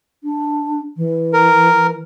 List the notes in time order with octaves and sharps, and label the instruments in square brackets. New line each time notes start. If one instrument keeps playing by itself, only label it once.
[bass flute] D4
E3
[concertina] A#4